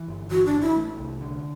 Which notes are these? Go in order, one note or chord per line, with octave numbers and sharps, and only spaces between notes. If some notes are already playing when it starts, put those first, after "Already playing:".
Already playing: E3
G1
E3 F#4
D4
A1
E4
A3
C2
D3